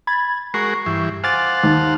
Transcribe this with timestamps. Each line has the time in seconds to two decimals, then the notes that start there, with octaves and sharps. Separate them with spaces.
0.07 B5 G#6 A6
0.54 G#3 F#4 A#4 C#6 C7
0.86 G2 E3
1.24 C5 F5 F#5 G#5 D6 A6
1.64 D#2